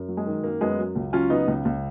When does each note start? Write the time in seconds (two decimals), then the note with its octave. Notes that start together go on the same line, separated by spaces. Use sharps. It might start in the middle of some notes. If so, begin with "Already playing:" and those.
Already playing: F#2
0.09 F#3
0.17 G#3
0.26 D#3
0.43 F#2 A#3
0.61 F#2 G#3 B3
0.78 F#3
0.96 C#2
1.13 F#3 C#4 F4
1.30 C#3 B3 D#4
1.48 C#2
1.65 C#2